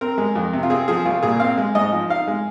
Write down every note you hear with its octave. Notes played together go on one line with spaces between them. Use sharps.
C4 A#4
G#3
F2
C3
F4
C4 G#4
F3 G#4
C2 F4
A#2 G#4
C4 F5
G#3
G#2 D#5
F3
D#4 F5
G#3